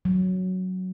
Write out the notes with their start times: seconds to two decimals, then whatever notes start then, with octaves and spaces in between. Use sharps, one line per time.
0.05 F#3